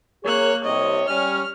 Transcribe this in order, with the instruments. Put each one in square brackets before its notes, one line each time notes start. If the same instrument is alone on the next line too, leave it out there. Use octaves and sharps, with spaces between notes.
[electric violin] A#3 F#6 [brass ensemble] G#4 A#4 C#5
[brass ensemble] C2 C3 C#5 [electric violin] D#5
[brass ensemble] G3 C#4 [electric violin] F6